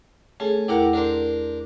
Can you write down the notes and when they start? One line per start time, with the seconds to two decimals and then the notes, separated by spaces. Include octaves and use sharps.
0.40 A3 C#4 G#4 A4
0.68 E2 E4 G4 A#4 F#5
0.93 D4 A#4 C5